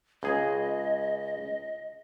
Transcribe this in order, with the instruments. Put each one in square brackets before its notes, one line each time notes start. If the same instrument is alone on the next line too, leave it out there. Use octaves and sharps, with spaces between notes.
[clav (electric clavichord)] C#2 G#4 [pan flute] D#5